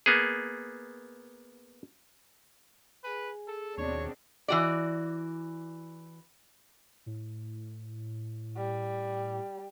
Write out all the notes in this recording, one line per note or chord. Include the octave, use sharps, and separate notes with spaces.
A#3 B3 G#4
G#4 B4 G#5
G#4 A4
D#2 B2 C4 D4 C#5
E3 F#4 D5
A2
G3